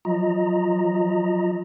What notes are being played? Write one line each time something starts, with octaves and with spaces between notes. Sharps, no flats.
F3 F#3 F4 D#5 A#5